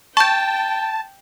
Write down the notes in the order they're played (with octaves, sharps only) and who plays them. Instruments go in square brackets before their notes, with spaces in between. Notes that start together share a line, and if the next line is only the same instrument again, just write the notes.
[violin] G5 [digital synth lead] A5 [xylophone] C#6 G6